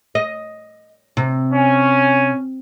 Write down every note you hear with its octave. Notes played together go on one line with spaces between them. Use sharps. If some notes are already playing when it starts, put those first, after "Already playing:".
D#5
C3
C#4 G#5